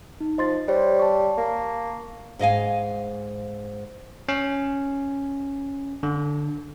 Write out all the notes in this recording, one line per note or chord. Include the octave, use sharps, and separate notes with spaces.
D#4
F3 D#5 C6 A6
G3 C5 C#5
A5 C#6
A#3
G#2 D#5 F5 G#5
C#4
D3